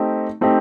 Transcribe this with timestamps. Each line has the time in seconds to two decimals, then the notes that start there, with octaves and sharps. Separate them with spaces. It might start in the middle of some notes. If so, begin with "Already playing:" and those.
Already playing: A3 C4 D#4 G4
0.41 A3 C4 D#4 G4